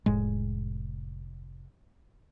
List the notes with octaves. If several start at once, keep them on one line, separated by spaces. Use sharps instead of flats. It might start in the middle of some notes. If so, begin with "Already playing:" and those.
F1 A2 G#3